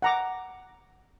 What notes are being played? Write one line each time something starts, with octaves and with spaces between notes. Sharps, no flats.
F#5 A#5 D6